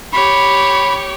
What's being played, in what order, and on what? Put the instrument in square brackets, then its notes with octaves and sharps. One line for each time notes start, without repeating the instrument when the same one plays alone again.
[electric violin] G4 C#5 [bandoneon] B5